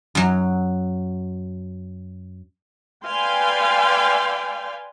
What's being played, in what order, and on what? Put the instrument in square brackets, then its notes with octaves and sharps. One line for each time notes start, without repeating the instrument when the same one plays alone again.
[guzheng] F#2 F#3
[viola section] B4 D5 F5 G5 G#5 C6